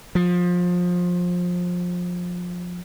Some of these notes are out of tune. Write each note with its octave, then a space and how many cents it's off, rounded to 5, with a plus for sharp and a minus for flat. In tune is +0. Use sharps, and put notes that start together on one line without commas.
F3 +25